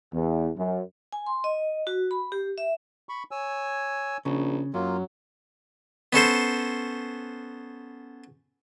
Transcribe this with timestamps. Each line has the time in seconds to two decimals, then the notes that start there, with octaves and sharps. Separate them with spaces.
0.14 E2
0.57 F#2
1.12 G#5
1.26 C6
1.44 D#5
1.87 F#4
2.11 B5
2.32 G4
2.58 E5
3.09 B5 C#6
3.31 C#5 G#5 E6
4.25 A#1 C#3
4.74 F#2 F#3 A#3 F4
6.13 B3 C#4 A4 C5